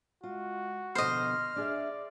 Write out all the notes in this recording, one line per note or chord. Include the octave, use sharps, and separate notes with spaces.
G#3 F4 F#4
B2 D3 F3 C5 D#5 F6
D4 G#4 D5 E5